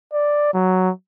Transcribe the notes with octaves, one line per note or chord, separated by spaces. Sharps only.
D5
F#3